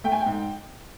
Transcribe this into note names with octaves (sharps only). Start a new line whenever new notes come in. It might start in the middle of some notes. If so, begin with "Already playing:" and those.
A3 G5
G#5
G5
G#2